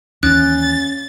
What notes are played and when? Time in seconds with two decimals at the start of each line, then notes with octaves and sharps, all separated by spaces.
0.23 D#2 E3 C#4 F#6 A6